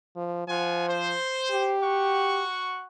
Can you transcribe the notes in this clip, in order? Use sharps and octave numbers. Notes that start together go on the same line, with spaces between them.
F3
F3 F4 F#5 G#5
C5
G4
F#4 F#5 C#6